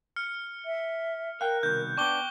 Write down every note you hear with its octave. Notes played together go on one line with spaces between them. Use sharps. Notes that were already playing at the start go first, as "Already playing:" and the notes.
F6 C#7
E5
A#4 F5 G5 F#6
C2 B2 D#3 G6
B3 D4 G5 C#6 D6 G7